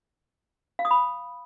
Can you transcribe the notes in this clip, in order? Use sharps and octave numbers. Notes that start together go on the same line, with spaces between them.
F5
D#6
B5